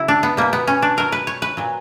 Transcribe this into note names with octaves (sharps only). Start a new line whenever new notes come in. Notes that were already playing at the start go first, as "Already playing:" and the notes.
Already playing: C#3 F#3 E4
D4
B3
B2 G3 A#3
B3
C#4
D4
B2 F#3 A#4
B4
C#5
B4
A#2 F#3